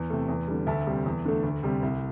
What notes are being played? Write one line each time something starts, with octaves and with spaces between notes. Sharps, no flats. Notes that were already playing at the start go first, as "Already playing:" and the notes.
Already playing: E2
C3 A3
E2
D3 G3
D2 E5 A5
C3 G3
E2
D3 A3
D2
C3 G3
C2